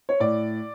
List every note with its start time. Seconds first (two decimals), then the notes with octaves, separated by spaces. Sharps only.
0.09 C#5
0.20 A2 D5